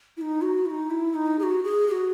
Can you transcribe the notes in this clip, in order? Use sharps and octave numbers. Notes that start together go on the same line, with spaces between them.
E4
D#4
F#4
E4
D#4
E4
D#4
G#4
F#4
G#4
G#4
F#4